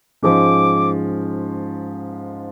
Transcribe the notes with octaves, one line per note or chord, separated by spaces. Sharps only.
G#2 F3 G#3 C#4 D6